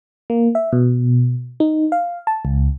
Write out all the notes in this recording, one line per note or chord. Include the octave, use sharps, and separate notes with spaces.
A#3
E5
B2
D#4
F5
A5
C#2